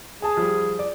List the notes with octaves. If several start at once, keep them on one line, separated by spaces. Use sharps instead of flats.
G#4 G#5 A5 D#6
F3 G3
D5